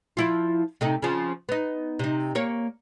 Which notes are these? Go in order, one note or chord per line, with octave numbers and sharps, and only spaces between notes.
F3 E4 F4
C3 A3 D#4
C#3 F3
B3 D#4
C3 D#4
A#3 C#5